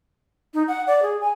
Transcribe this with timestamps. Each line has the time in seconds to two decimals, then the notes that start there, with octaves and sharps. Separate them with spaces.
0.54 D#4
0.68 F#5
0.87 D5
1.02 G#4
1.21 G#5